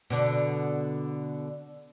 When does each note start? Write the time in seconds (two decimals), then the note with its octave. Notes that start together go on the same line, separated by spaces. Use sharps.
0.10 B2 D3 D4